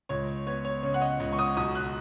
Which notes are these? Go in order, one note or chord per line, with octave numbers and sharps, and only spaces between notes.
C#2 C#5
B3 C#5
C#5
C#3 C#5
F#5
D#5
C#2
C#6
D#6
B1 D#6
F#6